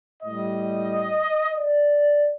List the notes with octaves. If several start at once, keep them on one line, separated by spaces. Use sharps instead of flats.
A2 G3 D#5
D5